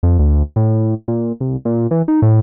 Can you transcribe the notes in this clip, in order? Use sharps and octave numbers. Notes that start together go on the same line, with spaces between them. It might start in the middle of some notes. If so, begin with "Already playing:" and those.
F2
D2
A2
A#2
C2
A#2
E3
D#4
A2